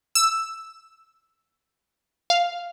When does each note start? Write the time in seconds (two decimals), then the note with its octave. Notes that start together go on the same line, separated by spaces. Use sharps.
0.15 E6
2.30 F5